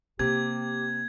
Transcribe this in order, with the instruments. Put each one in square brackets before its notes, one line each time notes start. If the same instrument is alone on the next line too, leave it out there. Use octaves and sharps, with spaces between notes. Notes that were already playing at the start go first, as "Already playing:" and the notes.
[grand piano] C3 [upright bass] A#3 [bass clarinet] G4 [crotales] G#6